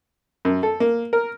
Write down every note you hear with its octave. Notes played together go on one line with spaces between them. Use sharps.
F#2
A4
A#3
A#4